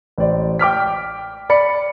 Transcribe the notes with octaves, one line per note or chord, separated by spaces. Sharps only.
A1 C5 D5
G5 D6 F6 B6
D5 B5 C#7